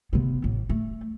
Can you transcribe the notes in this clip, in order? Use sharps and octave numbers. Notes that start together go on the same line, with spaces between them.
C3 B3
A1
A3